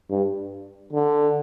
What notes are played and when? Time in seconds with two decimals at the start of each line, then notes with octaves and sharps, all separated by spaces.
0.10 G2
0.93 D3